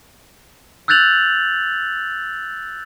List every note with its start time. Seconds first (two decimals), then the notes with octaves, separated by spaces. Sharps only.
0.88 E6 F#6 G6 A6 F7 F#7